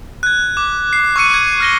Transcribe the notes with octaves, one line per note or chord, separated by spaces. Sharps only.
F#6 G#6
D6
C7
C#6 D6 E6 F#6 C#7 D#7
G#6
F6 A#6 G7